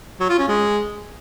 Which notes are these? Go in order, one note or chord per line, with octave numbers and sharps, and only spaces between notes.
F#3
F4
C#4
G#3